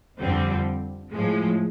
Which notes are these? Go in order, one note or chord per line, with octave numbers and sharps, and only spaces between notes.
F2 D3 G3 C4
A2 F3 G#3